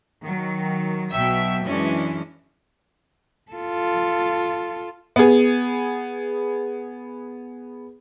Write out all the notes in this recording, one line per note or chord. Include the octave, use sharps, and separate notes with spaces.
D#3 F#3
B1 B2 F#3 E5 G5 B6
F#2 E3 G#3 C#4 D4
F4 A4
B3 G#4